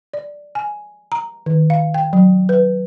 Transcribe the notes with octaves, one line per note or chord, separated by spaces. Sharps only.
D5
G#5
A#5
D#3
F5
G5
F#3
B4